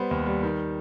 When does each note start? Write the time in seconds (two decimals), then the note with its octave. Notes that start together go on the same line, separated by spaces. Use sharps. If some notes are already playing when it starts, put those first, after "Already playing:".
Already playing: G3 B3 C5
0.11 D#2
0.26 G3
0.43 D#3